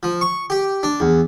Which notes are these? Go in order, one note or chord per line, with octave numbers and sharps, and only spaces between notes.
F3
C#6
G4
D4
E2